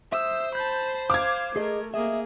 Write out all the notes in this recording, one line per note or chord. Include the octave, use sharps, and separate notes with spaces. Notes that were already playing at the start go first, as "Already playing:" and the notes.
C5 E5 D#6 E6
A5 B5 G6
F5 D6 G#6
A3 G#4 A#4 D#5
F#2 C3 A#3 G#4 D#5 E5